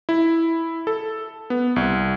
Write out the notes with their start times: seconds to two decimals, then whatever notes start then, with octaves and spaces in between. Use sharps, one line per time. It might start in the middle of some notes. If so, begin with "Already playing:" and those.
0.09 E4
0.87 A4
1.50 B3
1.76 C2